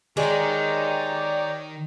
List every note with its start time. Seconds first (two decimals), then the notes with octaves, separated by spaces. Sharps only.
0.17 D#3 G#3 G4 C#5 D5 A#5